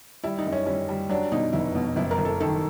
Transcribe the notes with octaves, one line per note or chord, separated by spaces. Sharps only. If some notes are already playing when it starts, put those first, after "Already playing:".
G3 E4
D#4
F#2
C#4
G3 C#4
G3
F#3 D4
B2 D#4
F1 E4
B2
F#1 E4
A#4
F#1
A4
D#3 A4